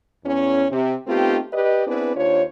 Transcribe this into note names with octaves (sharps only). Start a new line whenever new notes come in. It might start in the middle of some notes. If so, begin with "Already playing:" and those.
E2 C#4
C3
A3 B3 C4 D#4 F4 G4
G4 B4 D5 D#5
B3 C4 D4 E4 G#4 B4
D#2 D4 F4 C5 C#5